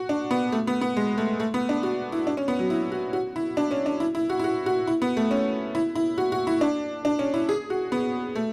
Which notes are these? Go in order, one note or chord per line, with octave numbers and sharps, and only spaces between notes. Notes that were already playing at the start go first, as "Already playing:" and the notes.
Already playing: F#4
D4
B3
A3
B3
B3
G#3
A3
A3
B3
D4
F#4
E4
D4
C#4
B3
F#3
E4
F#4
F#4
E4
D4
C#4
D4
E4
E4
F#4
E4
F#4
F#4
E4
B3
A3
C#4
E4
E4
F#4
F#4
E4
D4
D4
C#4
E4
G#4
F#4
B3
A3